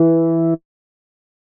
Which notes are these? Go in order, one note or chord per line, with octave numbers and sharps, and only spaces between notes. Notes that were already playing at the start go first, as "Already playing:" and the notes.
Already playing: E3